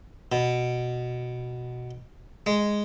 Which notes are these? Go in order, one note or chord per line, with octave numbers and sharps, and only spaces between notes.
B2
G#3